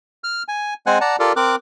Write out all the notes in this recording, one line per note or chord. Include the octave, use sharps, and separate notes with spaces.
F6
G#5
G#3 C4 C5 F#5 G#5 F#6
D5 F#5 A5 A#5
F4 G4 A4 A#4 D5
C4 A#4 D6 F#6